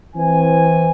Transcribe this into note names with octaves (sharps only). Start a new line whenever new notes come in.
E3 C4 G#5